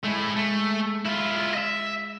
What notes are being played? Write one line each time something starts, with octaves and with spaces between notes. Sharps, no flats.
G#3 A3 E4
A3
E4 F4
D#5 E5